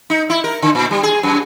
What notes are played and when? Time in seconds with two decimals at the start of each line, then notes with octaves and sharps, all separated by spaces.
0.10 D#4
0.30 E4
0.44 A#4
0.62 D3
0.75 A#2
0.91 G3
1.03 G#4
1.23 F#2